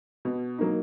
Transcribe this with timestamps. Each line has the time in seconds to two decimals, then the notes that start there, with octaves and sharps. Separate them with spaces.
0.25 B2
0.59 F#3 A#3 D#4